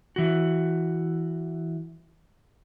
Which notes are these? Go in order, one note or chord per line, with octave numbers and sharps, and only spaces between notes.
E3 F#4